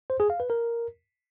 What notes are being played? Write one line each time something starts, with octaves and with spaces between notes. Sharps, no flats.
C5
G#4
F5
B4
A#4